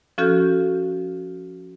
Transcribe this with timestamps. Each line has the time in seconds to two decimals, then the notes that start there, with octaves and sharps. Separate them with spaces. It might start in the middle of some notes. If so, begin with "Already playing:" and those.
0.18 F3 C#4 F#4 A4 F6 G6